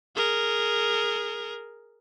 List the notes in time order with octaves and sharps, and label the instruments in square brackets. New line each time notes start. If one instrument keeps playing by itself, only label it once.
[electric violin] G#4 A#4